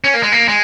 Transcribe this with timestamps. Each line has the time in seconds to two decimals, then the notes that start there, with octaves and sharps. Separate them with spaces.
0.04 C#4
0.14 A#3
0.23 G#3
0.32 A#3
0.48 G#3